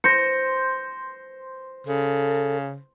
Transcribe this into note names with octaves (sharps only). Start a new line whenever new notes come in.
C5 A#6 C#7
C#3 A4